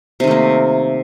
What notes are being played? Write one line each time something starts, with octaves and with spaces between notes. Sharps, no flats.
C3 D#3 A3 A#3